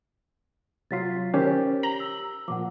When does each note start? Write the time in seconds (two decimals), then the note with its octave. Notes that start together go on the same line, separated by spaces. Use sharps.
0.91 C3 F#3 F4 A6 B6 C7
1.34 D#3 C#4 G4 A#4 C5 C#5
1.83 A#5 F#7 G7
2.00 E6
2.48 A#2 F3 F#5 D6